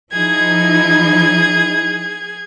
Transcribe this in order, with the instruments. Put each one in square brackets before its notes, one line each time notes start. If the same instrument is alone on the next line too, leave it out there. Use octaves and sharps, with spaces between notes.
[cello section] F3 D#4 E4 [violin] G#4 G#6